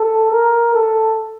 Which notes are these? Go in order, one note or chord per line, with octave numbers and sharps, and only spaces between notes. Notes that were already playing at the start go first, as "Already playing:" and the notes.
Already playing: A4
A#4
A4